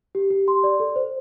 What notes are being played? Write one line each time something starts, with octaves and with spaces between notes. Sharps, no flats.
G4
G4
C6
D5
A4
C5